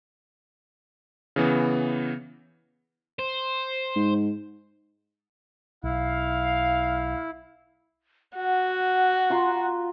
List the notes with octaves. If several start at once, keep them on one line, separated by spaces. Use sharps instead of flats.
C#3 E3 B3
C5
G#2
B1 E4 F5
F#4 F#5
F4 A#5 C6